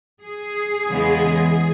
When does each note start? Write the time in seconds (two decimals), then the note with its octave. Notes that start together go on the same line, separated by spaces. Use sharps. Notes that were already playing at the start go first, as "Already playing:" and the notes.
0.23 G#4
0.89 E2 C#3 E3 G#3 B3